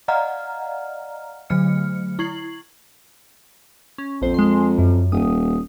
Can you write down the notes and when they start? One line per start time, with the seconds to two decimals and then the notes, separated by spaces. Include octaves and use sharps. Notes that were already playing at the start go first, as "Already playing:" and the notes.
0.08 D5 D#5 F5 F#5 A#5 F6
1.50 D3 F#3 A3 F6 C#7
2.19 E4 C#6 G#6 C7 F#7
3.98 C#4
4.21 A#1 F2 C5
4.34 G#3 C6
4.78 F#2
5.12 D#1 D#6